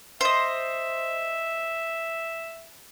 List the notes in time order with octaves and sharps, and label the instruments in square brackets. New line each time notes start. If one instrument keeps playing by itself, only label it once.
[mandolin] C5 D#5 [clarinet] E5